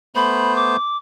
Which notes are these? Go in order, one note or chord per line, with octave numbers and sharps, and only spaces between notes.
A3 B3 C5 B5
D6